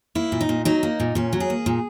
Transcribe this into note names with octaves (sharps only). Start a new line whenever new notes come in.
A#3 E4
A#2
D#4
A#2
F#3 D#4
A#3
A#2
A#2 C#4
F#3
G#4
A#3
A#2